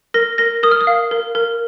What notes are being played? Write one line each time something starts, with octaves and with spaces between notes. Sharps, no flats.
A#4 A#6
A#4 A#6
A#4 D#6
F6
D#6
F5
A#4
A#4